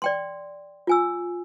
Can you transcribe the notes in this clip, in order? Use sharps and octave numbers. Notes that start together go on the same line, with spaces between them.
D5 G5 C6
F4 G#5 E6